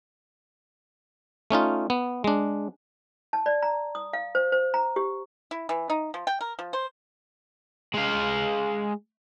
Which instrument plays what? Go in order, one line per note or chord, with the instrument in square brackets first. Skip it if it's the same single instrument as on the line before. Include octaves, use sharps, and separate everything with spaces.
[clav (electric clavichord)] A3 C#4 D#4 F4
B3
G#3 D4
[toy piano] A5
D5
A#5
D#6
F5
C5
C5
A#5
G4
[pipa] E4
E3
D#4
F3
G5
A#4
F3
C5
[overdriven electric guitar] G#3 F5